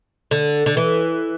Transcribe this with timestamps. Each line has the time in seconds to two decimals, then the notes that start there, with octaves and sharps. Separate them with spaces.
0.31 D3
0.66 D3
0.77 E3